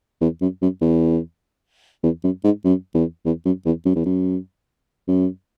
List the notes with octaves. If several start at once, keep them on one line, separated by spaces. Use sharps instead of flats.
E2
F#2
F#2
E2
E2
F#2
G#2
F#2
E2
E2
F#2
E2
F#2
E2
F#2
F#2